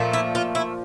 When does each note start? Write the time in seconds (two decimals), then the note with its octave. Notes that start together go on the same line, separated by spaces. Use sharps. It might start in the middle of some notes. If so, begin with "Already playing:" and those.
Already playing: A#2 F3 A3
0.13 E4
0.35 F4
0.55 E4